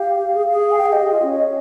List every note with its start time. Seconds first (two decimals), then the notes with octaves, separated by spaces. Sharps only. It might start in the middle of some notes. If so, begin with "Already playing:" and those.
Already playing: G4 F5
0.34 G#4
0.52 G#4
0.71 G#5
0.78 G5
0.83 G#4 F5
0.92 G4 D#5
1.02 G#4
1.12 F4
1.22 C#4